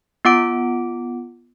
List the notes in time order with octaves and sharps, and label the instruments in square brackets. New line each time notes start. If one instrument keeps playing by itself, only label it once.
[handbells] B3 F4 F#5 D6 D7